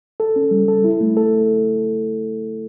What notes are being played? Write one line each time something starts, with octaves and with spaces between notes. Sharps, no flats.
A4
C#4
G3
A4
E4
A3
A4